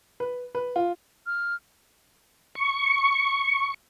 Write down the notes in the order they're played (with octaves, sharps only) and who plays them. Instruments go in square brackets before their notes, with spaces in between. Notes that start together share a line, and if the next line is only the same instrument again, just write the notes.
[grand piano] B4
B4
F4
[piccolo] F6
[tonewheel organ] C#6